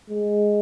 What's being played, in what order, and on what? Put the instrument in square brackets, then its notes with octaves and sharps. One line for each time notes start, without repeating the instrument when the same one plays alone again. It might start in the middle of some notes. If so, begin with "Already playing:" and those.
[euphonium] G#3